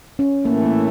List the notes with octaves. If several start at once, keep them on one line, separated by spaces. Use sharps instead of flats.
C#4
A2 E3 A3 A#3
A#3